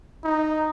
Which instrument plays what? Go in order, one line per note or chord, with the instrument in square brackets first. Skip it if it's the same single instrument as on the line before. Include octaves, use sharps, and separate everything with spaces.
[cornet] D#4